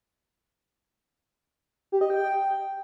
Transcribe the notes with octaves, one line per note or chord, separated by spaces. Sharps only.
G4
D#5
G5